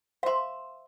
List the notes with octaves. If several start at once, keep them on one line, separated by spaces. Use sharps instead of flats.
C5 E5 F5 C6